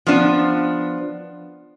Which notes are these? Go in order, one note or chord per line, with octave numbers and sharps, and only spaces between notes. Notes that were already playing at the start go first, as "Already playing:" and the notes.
F3 B3 D4